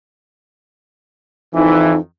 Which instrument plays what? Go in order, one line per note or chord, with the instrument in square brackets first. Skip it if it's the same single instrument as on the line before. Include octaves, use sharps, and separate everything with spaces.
[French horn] F2 [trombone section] E3 [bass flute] D#4